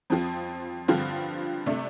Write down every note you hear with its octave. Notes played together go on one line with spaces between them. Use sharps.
F2 F3 C4
G2 D3 F3 C4 F4
C3 A3 D4